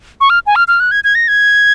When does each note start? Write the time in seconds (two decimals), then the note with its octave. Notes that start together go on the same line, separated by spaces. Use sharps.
0.21 C#6
0.30 F6
0.47 G#5
0.56 F6
0.68 F6
0.80 F#6
0.91 G#6
1.04 G#6
1.15 A#6
1.28 G#6